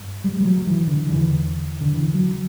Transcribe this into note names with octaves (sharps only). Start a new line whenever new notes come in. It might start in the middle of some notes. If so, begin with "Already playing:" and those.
Already playing: G2
G3
G3
F#3
E3
D3
E2 D3 E3
D3
E3
F#3